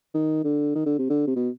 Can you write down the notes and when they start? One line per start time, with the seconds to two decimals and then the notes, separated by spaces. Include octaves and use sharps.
0.14 D#3
0.44 D3
0.75 D#3
0.86 D3
0.98 C3
1.10 D3
1.27 C3
1.36 B2